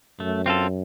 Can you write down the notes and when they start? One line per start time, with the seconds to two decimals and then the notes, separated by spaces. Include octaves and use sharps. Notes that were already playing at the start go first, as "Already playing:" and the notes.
0.19 F#2 A3
0.46 C4 F4 A4